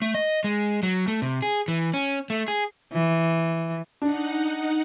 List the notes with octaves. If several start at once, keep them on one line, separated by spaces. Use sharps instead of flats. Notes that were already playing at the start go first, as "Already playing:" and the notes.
A3
D#5
G#3
F#3
A3
C3
G#4
E3
C#4
A3
G#4
E3
D4 D#4 F#5